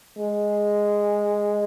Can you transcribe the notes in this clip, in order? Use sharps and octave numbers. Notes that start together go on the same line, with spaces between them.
G#3